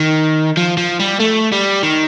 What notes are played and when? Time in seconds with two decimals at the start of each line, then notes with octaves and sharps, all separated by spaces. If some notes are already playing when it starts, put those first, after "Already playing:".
Already playing: D#3
0.57 F3
0.77 F3
0.99 G3
1.20 A3
1.52 G3
1.83 D#3